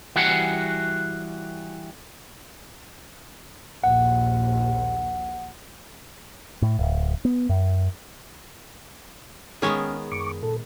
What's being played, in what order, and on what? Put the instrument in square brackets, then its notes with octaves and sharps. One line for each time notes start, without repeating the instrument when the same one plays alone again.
[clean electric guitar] E3 G3 F#4 G#4 F#5
[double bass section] A#1 D#2 [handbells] F#5
[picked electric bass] A2
D1
B3
F#2
[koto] D#3 G#3 B3 [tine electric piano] C#4 F6 [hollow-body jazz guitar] G#4 C#5
[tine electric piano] F#2 [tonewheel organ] C#6 D6
[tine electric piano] A#2 [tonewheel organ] A4